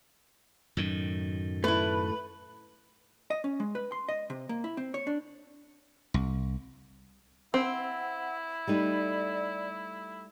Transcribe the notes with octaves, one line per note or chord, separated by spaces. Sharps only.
F#2 A2 D#3
A3 E4 B4
D#5
C#4
G#3
B4
C6
D#5
C3
A#3
E4
C4
C#5
D4
C2
C4 E4 F#5
G3 A3 D#4 D5